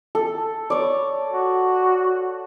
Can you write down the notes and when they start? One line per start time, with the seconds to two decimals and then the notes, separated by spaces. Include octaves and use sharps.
0.15 A4
0.70 C#5 D5
1.32 F#4